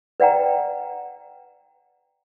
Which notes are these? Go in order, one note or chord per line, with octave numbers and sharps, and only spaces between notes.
B4 D5 F#5 G5 A#5